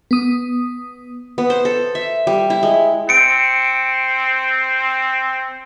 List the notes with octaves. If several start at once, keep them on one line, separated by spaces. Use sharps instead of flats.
B3 D#6
B3
C5
A4
E5
G3
E4
G#3
C4 C#7 D7